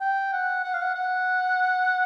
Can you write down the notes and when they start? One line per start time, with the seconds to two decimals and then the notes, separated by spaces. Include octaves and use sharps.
0.01 G5
0.33 F#5
0.64 F#5
0.74 F5
0.82 F#5
0.95 F#5